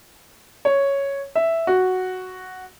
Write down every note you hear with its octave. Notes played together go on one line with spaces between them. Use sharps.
C#5
E5
F#4